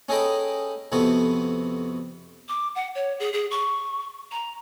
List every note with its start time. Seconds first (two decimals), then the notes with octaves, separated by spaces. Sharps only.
0.09 C#4 G#4 A4 D#5 G5 B5
0.92 F2 C3 B3 F#4 A4
2.48 D6
2.75 F#5
2.95 C#5
3.20 G#4
3.33 G#4
3.51 C#6
4.31 A#5